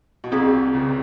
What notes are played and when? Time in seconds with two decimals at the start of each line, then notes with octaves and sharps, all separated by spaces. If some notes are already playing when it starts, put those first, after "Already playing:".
0.24 B2
0.32 C2 C3 C4 F4 G#4
0.74 C#2 C#3